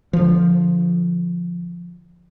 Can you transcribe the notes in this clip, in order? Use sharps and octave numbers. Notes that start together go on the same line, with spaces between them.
D3 F3